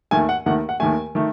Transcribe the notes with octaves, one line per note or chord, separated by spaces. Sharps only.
D#2 D#3 A3 G#5
F#5
D#2 D#3 A3 F#5
F#5
D#2 D#3 A3 G#5
D#3 A3